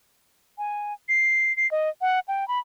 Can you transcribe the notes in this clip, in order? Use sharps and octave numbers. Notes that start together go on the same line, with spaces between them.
G#5
C7
C7
D#5
F#5
G5
B5